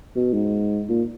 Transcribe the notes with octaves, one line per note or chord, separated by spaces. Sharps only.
B2
G#2
A#2